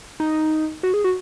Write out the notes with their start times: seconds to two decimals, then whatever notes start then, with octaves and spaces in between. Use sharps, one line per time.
0.20 D#4
0.83 F#4
0.94 G#4
1.04 F#4